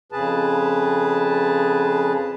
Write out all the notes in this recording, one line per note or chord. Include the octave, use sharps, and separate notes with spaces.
F2 C#3 G#4 B4 A5